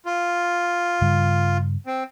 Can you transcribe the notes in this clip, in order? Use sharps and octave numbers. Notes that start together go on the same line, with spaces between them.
F4
G2 C#3 G3
C4